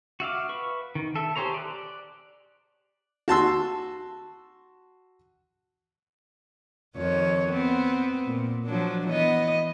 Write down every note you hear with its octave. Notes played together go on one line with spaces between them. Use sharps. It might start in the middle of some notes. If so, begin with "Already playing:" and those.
F#4 E5 F5 D6
B4 C#6
D#3
A4 E5
G4 G#4 C5 C#5 A#5
D5 F#6
F#4 A5 C6 E6
F2 D#3 C#5
B3 C4
A#2
F3 F#3 D4
E3 B3 D#5